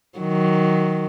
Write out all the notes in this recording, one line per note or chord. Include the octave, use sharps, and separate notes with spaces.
D#3 F#3